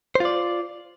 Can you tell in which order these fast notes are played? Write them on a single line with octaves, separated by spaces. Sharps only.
C5 F4 D5